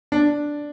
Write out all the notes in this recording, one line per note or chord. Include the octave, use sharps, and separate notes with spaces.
D4